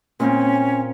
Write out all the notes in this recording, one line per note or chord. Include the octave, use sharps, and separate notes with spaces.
A#2 C4 C#4